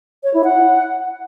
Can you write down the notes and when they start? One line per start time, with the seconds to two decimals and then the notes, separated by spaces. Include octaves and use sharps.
0.24 C#5
0.34 E4
0.44 F#5